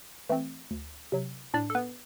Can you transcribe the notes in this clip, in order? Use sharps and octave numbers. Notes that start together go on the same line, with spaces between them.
E3 A3 C4
D2
C3 F#3
A2 D4 D5
A4
B3 B4